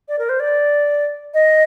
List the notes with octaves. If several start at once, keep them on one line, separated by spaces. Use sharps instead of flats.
D5
A#4
C5
D5
D#5